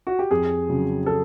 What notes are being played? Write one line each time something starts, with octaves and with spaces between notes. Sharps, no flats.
F#4
G4
F2 G#4
C#3 F#3
A4